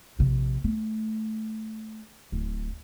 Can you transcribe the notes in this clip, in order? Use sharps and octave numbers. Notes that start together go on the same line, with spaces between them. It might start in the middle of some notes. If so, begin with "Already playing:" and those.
A#1 C3
A3
D1